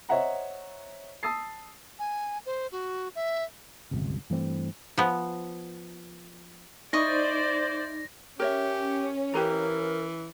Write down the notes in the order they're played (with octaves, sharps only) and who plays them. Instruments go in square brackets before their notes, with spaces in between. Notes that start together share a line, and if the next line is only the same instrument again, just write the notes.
[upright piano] C5 C#5 D#5 E5 F#5 A#5
A5 D#6 E6 A6 C7
[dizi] G#5
C5
F#4
E5
[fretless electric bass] D1 G1 C#2 C3
G2 E3 A3 C4
[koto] F3 B3
[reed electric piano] D#4 [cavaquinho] E4 D#5 C#6 [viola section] C5 D5 [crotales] A#6
[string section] C#4 [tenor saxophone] G4 [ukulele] A#4 C#5 E5
[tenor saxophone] E3 [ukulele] G4 B4 A#5 [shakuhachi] A#4